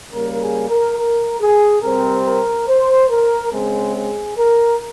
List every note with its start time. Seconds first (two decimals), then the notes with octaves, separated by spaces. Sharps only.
0.12 C#3 G3 A#3 A#4
0.41 G#4
0.69 A#4
0.98 A#4
1.40 G#4
1.82 C3 G3 C4 A#4
2.25 A#4
2.68 C5
3.10 A#4
3.53 C#3 G#3 C4 G#4
3.95 G#4
4.38 A#4